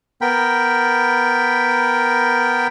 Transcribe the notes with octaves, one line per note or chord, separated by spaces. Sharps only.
B3 A#4 G5 B5